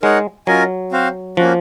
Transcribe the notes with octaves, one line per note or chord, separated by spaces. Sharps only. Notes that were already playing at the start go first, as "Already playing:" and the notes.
G#3 D#4 A#4 C#5 F#5
F#3 C#4 F4 A#4 D#5 G#5
C4 F#4 C5 F5
F3 A#3 C#4 F#4